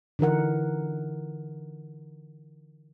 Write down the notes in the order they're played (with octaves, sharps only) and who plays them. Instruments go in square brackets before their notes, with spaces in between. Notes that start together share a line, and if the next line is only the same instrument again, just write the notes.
[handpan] D3 E3 D#4 A#4 F#5